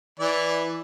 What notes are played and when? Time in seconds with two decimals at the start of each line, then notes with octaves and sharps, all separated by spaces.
0.19 E3 D5